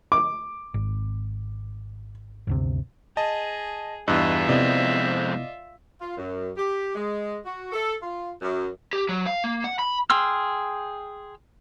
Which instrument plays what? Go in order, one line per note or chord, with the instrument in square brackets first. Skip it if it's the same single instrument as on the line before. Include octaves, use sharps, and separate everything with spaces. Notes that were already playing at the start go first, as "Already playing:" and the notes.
[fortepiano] D6
[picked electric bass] G#1
G1 D2 C3
[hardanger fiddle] G#4 [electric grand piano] D#5 A5
[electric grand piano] E2 G2 [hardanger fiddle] F4 E5 [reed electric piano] D#5 E6 F#6
[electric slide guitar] F2 G#3 C4 [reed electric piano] C3 B3 E4 [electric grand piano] D5 D#5
[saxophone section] F4
F#2
G4
G#3
F#4
A4
F4
F#2
[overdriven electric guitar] G4
F#3
F5
A#3
F#5
B5
[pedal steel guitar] G#4 G5 C6 E6 F6